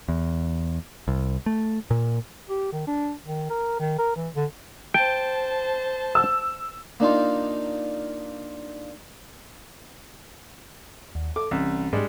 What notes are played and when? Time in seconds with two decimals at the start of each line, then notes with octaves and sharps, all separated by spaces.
0.08 E2
1.08 C2
1.46 A3
1.91 A#2
2.49 G4
2.72 D#3
2.87 D4
3.26 D#3
3.50 A#4
3.80 D#3
3.99 A#4
4.16 E3
4.36 D3
4.94 C5 G5 A5
6.15 E6
7.00 A#3 D4 D#4 F4
11.15 D#2
11.36 A4 D6
11.51 C2 E3 C#4
11.93 G#2 G3 G#3 D4